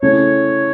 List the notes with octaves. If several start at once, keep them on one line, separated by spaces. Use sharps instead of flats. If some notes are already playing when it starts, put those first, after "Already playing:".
C#3 A3 C#4 E4 C#5